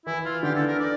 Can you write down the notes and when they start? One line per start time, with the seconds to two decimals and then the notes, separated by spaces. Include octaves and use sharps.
0.06 E3 E4
0.25 F4
0.43 D3 G4
0.55 A4
0.67 A#4
0.80 D5